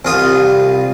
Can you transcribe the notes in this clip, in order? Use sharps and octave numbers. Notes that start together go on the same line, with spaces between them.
C2 F4 D#6